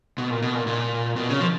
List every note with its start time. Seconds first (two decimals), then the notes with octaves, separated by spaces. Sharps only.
0.18 B2
0.30 A#2
0.42 B2
0.55 A#2
0.67 A#2
1.16 B2
1.28 C#3
1.40 F3